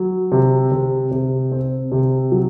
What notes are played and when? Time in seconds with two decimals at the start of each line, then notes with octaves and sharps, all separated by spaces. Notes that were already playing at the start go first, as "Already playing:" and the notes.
Already playing: F#3
0.32 C3
0.72 C3
1.11 C3
1.52 C4
1.92 C3
2.32 F#3